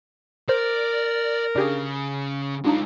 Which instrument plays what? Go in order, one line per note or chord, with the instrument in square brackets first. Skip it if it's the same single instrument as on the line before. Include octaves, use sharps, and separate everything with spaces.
[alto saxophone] A#4 [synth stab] C5 [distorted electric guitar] D5
[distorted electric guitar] C#3 [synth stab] D4 G4 G#4
[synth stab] F#3 D4 D#4 [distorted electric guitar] G#3 F4